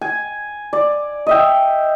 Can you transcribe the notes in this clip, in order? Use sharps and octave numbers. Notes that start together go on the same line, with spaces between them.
G#5
D5
D#5 E5 G5